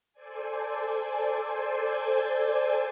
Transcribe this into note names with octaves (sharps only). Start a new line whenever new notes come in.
A4 C5 D5 G#5